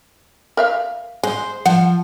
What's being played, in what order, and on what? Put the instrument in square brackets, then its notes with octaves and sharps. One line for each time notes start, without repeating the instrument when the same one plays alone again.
[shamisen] A#4 E5 F5
[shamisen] G#3 [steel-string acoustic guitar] C5
[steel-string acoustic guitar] F3 [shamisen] F#5